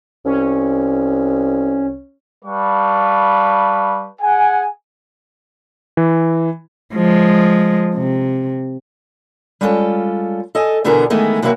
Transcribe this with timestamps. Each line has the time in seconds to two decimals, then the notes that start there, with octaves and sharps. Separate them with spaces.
0.25 C2 C#4
2.45 G3 B4 F5 A5 C#6
4.22 G#4 F#5 G#5
5.97 E3
6.94 F3 G#3
7.95 C3
9.61 G3 G#3 C#4 F4 A4
10.55 A4 D#5 G#5
10.84 B2 D3 E3 B3 G#4 A#4
11.10 D#3 E3 G#3 A3 B3
11.42 C3 E3 F#3 A#3 E4 F#4